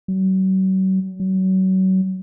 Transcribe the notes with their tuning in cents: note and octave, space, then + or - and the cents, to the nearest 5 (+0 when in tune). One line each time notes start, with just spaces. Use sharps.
F#3 +40
F#3 +30